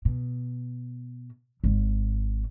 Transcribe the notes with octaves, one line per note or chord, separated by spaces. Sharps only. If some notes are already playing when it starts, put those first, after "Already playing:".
B2
G#1 G#2